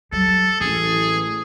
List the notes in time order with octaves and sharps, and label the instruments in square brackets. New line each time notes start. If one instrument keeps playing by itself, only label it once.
[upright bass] F#3 G3 [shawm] A4
[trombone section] A1 [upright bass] E3 [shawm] G#4